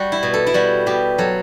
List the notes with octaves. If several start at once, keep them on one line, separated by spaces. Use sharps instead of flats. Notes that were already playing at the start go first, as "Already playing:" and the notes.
Already playing: G3 F#4
E4
B2
A4
E4
G3 F#4
B2 G4
F#3 A4